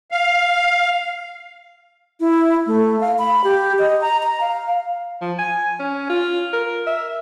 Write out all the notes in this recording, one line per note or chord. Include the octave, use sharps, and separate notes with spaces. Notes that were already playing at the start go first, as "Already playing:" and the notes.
F5
E4
A3
F5
B5
G4
D#5
A#5
A#5
F5
F3
G#5
C#4
F4
A#4
E5